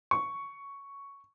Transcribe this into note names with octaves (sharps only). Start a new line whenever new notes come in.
C#6